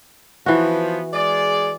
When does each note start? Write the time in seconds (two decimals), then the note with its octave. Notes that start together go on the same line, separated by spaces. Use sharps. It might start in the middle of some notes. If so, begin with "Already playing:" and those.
0.46 E3 F3 B3 F#4
1.13 G#3 G#4 D5